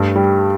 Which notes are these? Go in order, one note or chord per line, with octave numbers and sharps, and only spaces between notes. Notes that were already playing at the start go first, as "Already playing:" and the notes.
Already playing: G2 A3
G3